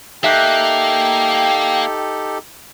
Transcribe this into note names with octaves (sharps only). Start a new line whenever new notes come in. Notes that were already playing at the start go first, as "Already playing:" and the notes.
A#3 D#4 G4 A4 E5 G5 F#6 G6